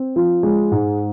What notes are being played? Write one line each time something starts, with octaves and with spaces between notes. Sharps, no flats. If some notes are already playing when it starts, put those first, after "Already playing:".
Already playing: C4
F3
G#3
G#2